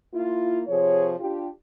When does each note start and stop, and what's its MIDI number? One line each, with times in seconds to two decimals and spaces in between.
0.14 0.62 58
0.14 0.62 64
0.14 0.62 65
0.68 1.12 48
0.68 1.12 53
0.68 1.12 68
0.68 1.12 73
1.19 1.46 62
1.19 1.46 65
1.19 1.46 67